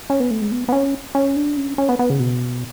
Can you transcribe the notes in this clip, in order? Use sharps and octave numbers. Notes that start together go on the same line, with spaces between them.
C#4
B3
A3
G#3
B3
B3
C#4
C#4
D4
C#4
C#4
B3
B3
C#3
B2